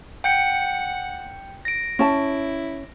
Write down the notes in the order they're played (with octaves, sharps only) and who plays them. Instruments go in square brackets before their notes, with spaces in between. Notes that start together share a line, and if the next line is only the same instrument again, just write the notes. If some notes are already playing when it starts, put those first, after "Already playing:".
[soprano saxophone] F#5 [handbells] G5 G6 C#7
[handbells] A#6 D7
[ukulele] C#4 A5 [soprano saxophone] E4